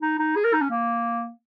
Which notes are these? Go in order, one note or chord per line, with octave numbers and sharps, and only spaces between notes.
D#4
D#4
G#4
A#4
D#4
C#4
A#3